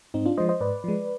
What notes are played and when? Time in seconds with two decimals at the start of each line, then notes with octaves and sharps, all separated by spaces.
0.14 G#2 C4 D#4
0.26 D4 F4
0.37 F3 G#3 C5 D#5
0.49 C5 D#5
0.61 G#2 B4 D5
0.84 F3 G#3